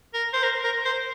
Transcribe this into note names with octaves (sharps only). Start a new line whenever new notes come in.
A#4
C5
A#4
A#4
C5